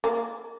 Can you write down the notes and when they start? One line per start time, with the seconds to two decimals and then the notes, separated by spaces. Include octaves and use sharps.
0.04 A#3